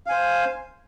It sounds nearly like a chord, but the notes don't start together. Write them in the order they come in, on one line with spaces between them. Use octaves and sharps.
F5 G#5 C5